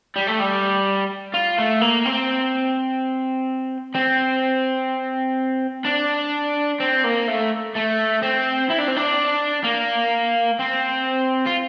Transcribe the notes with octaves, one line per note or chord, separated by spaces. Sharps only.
G3
A3
G3
F4
A3
A#3
C4
C4
D4
C4
A#3
A3
A3
C4
E4
D4
C4
D4
A#3
C4
F4